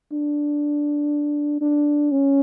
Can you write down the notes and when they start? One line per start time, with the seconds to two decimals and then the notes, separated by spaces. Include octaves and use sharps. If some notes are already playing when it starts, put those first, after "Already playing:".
0.13 D4
1.61 D4
2.11 C#4